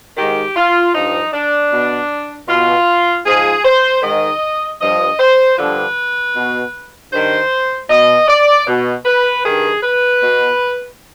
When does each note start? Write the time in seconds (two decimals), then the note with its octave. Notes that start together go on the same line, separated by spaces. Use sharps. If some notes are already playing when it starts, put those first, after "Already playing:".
0.16 G#2 D#3 G4
0.56 F4
0.94 G2 F3 D#4
1.33 D4
1.72 B2
2.48 B2 F4
3.25 G#2 F3 G#4
3.65 C5
4.03 G#2 D#3 D#5
4.80 G2 F3 D#5
5.19 C5
5.58 G2 D3 F3 B4
6.35 B2
7.12 G2 D#3 C5
7.90 B2 D#5
8.28 D5
8.67 B2
9.05 B4
9.43 G2 D#3 G#4
9.83 B4
10.22 B2